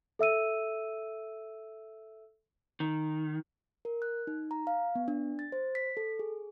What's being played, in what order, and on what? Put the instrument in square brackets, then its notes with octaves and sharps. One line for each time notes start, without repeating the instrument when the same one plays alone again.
[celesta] A4 E5 E6 D#7
[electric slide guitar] D#3
[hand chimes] A#4
F#6
D#4
A#5
F5
B3
D4
A6
C5
B6
A4
G#4